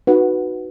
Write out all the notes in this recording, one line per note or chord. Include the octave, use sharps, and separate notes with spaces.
D#4 F#4 B4 F#5